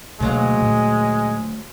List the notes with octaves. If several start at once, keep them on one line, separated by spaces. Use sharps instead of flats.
D2 B2 F#3 G#3 A#3 F5
A#2